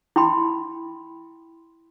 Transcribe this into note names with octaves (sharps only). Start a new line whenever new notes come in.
E4 G5 B5 C6